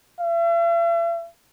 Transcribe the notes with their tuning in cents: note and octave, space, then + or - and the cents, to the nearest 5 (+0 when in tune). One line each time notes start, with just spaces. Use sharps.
E5 +45